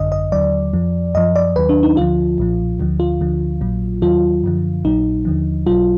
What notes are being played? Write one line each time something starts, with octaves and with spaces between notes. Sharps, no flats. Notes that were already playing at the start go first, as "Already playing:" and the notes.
Already playing: G#1 F#2 D3 D#5
D#5
D#2 D3 F#3 D5
F2 F3
F#2 F3 D#5
D5
D#2 D#3 F#3 B4
D4
D#4
D2 D3 F3 F4
B1 A#2 F3
D2 D3 F3
F4
D2 D3 F3
A#1 A#2 F#3
D#2 D#3 F#3 F4
F#2 D3 F3
A#1 A#2 F#3 D#4
D#2 D3 F3
B1 B2 F#3 F4